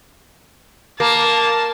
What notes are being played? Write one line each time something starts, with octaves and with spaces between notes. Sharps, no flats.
A#3 A5